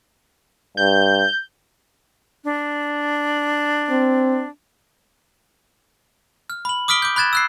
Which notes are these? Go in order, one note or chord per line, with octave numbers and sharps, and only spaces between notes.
G2 G6
D4
C4
F6
B5 F#7
D6 D#6 F6 B6 D7 G7
D6 G6
B5 F#6 G#6 A6 E7
E6 F#6 C7